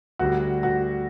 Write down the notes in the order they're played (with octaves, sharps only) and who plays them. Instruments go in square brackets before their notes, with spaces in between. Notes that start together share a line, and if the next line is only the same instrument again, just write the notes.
[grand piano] D2 D3 G3 [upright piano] F#4
[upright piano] F#4